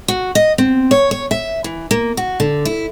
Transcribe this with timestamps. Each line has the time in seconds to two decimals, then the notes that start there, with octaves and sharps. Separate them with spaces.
0.08 F#4
0.35 D#5
0.58 C4
0.91 C#5
1.11 C#5
1.31 E5
1.64 E3
1.91 A#3
2.17 F#4
2.40 D3
2.65 E4